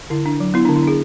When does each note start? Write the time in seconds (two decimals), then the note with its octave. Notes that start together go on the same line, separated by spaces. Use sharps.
0.10 D3 E4
0.26 D4
0.40 F#3
0.54 B3 E4
0.65 D4
0.69 D3
0.76 E4
0.83 D4 G#4